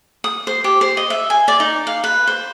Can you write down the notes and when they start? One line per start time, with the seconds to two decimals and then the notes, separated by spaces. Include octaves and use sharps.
0.24 D#6
0.47 C5
0.64 G4
0.81 C5
0.97 D#5
1.10 E5
1.30 G#5
1.48 D5
1.60 D#4
1.87 F5
2.04 B4
2.27 C5